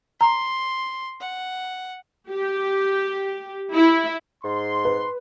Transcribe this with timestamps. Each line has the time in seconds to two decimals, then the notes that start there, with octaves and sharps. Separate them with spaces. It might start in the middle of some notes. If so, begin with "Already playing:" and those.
0.21 A#5 C6
1.21 F#5
2.30 G4
3.74 E4
4.44 G#2 C6
4.85 B4